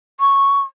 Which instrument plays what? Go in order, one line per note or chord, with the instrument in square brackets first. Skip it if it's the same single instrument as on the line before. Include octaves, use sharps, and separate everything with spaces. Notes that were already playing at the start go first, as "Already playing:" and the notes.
[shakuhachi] C#6